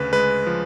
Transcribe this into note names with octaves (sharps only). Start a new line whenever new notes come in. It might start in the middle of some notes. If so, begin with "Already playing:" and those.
Already playing: D2 C#3 B4
G#3 B4
F3